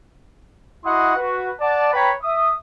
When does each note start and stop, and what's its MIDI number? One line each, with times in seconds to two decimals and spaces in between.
0.85 1.14 64
0.85 1.14 66
0.85 1.14 75
0.85 1.14 78
0.85 1.14 84
0.85 1.14 87
1.16 1.51 66
1.16 1.51 71
1.61 1.90 74
1.61 1.90 78
1.61 1.90 81
1.93 2.11 71
1.93 2.11 73
1.93 2.11 79
1.93 2.11 82
1.93 2.11 83
2.23 2.52 76
2.23 2.52 87